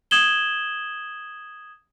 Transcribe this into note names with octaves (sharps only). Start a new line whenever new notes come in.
D#6 G#6 E7 F#7 G7